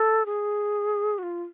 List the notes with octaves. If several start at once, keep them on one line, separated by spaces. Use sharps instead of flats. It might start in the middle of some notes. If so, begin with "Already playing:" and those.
Already playing: A4
G#4
F#4
F4